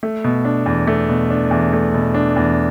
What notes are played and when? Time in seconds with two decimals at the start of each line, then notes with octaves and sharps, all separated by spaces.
0.03 A3
0.24 B2
0.45 D4
0.66 E2
0.87 A3
1.09 B2
1.30 D4
1.51 E2
1.73 A3
1.94 B2
2.14 D4
2.36 E2